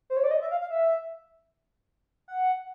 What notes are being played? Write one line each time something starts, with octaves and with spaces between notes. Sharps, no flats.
C5
C#5
D5
D#5
E5
F5
F5
E5
F#5